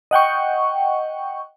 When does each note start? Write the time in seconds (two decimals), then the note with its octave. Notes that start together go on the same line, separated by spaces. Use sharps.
0.11 D#5 F#5 G5 C#6